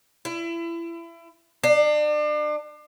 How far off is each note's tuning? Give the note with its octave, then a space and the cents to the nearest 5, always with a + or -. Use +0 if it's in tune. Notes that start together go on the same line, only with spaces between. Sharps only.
E4 +30
D4 +35